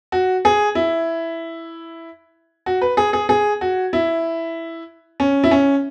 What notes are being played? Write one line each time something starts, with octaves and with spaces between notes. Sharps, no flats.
F#4
G#4
E4
F#4
B4
G#4
G#4
G#4
F#4
E4
C#4
E4
C#4